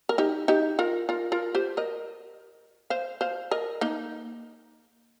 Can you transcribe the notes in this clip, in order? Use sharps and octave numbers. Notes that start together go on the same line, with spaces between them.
A#4
D#4 G4
D#4 G4
F4 A#4
F4 A#4
F4 A#4
G4 C5
A#4 D#5
C5 F5
C5 F5
A#4 D#5
A#3 D#4